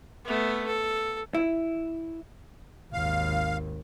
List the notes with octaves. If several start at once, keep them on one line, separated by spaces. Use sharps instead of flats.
A3 B3
A4
E4
G#1 D#2 F5